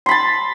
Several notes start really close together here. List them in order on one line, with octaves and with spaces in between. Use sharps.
C6 B5 A5